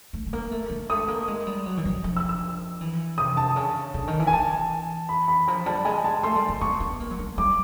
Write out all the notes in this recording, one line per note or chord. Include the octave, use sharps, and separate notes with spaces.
A3
A3
A#3
A3
G#3
A3 D#6
A#3
G#3
G3
F#3
E3
F3
F3
E6
E6
E3
C3 D#6
A5
C#3
D3
D#3
E3
G#5
E3 A5
B5
B5
F3 A#5
G3 A5
G#3 G#5
A5
A3 C6
G3
G#3
B3 C#6
B3
A#3
F#3
G3
G3 D6